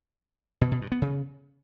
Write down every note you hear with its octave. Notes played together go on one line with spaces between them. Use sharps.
B2
B2
G2
B3
C#3